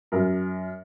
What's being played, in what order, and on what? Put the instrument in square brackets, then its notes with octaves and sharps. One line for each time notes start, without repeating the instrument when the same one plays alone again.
[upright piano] F#2 A#4